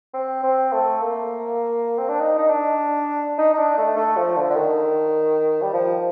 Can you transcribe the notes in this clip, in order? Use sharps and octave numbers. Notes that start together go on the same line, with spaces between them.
C4
C4
A3
A#3
C4
D4
D#4
D#4
D4
D#4
D#4
D4
A3
A3
F3
D3
D3
D#3
G3
F3